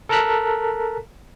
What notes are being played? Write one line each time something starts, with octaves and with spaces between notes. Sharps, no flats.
A4 A#4 A5 A#5 F#6 B6